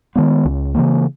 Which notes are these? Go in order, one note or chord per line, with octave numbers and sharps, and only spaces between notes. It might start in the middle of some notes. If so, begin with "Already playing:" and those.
D#3 G#3 B3
C#2
C#3 E3 A#3